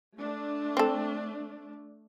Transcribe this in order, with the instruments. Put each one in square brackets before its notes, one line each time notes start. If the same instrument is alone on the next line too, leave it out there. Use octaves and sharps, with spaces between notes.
[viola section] A3 D4
[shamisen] C4 A4